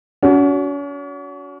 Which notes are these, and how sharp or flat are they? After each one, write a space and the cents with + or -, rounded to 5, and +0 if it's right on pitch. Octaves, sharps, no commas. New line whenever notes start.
C#4 +40 F#4 +0